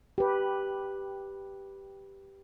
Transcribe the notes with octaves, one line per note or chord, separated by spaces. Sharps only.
G4 B4